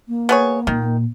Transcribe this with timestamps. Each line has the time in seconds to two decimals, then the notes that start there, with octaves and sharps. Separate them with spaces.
0.08 A#3
0.29 B3 G#4 C#5
0.67 A#2 D#3